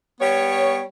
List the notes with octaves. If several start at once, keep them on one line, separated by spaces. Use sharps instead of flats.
G3 B3 C#5